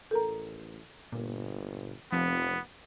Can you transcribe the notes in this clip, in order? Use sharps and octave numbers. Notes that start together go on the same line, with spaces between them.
A1 A4 A#4 A#5
G1 A#2
F1 F3 B3 C4